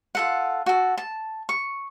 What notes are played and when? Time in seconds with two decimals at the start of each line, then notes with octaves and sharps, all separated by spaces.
0.15 F4 A4 F#5
0.66 F#4 A4
0.98 A5
1.49 C#6